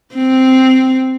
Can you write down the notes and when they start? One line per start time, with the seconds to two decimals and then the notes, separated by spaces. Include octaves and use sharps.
0.15 C4